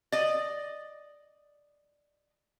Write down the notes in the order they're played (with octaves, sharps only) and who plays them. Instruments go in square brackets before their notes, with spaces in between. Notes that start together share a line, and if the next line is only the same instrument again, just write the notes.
[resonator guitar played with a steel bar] D5 D#5